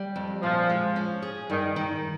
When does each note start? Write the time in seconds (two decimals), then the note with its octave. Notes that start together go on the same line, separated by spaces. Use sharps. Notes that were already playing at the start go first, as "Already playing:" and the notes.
Already playing: G3
0.16 F2
0.42 A#2 F3
0.70 G#3
0.96 C#4
1.22 G#4
1.50 G2 D#3
1.76 D#3